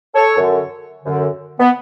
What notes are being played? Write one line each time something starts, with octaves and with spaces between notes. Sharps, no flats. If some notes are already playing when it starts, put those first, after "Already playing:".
A4 C#5
F#2 D3
F#2 D3
B3